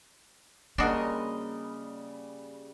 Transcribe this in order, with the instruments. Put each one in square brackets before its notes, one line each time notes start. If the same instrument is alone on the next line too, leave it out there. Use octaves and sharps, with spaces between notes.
[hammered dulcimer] C#3 G3 [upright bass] A#3 [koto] D4 F#4 [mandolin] A#4 D#5 C6